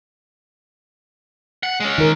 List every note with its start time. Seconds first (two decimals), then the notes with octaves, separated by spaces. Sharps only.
1.63 F#5
1.80 G#3 C#4
1.98 D#3 A#4